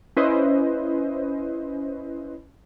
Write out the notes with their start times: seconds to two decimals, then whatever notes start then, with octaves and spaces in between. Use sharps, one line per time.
0.17 C#4 E4 B4 C5 D#5